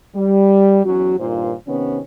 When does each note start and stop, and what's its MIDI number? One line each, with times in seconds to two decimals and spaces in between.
0.16 0.81 55
0.84 1.14 40
0.84 1.14 54
0.84 1.14 61
0.84 1.14 66
1.19 1.54 43
1.19 1.54 46
1.19 1.54 51
1.19 1.54 65
1.19 1.54 72
1.67 1.99 48
1.67 1.99 51
1.67 1.99 59
1.67 1.99 61